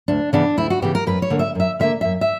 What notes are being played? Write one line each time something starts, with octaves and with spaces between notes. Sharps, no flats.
D2 D4
C#3 E3 B3 D4
D2 E4
F#4
C#3 E3 B3 G4
A#4
F#2 B4
C#5
D3 A#3
E5
F#2 E5
D3 A#3 E5
F#2 E5
E5